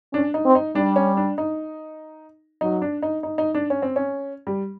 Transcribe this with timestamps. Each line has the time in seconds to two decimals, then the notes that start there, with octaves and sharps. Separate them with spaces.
0.13 C#4 D4
0.34 D#4
0.45 C4
0.55 D#4
0.75 G3 D4
0.96 C#4
1.17 D4
1.38 D#4
2.61 F#3 D#4
2.82 D4
3.02 D#4
3.23 D#4
3.38 D#4
3.54 D4
3.70 C#4
3.82 C4
3.96 C#4
4.47 G3